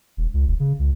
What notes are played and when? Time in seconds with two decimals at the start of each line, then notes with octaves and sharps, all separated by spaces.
0.17 E1
0.34 C#2
0.47 E1
0.60 C#3
0.79 C#2